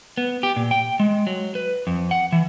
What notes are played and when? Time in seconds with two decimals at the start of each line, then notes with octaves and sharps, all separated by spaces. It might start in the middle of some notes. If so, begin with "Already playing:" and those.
0.18 B3
0.43 G4
0.56 A#2
0.71 G5
1.00 G#3
1.27 F#3
1.55 B4
1.87 F2
2.11 F#5
2.32 E3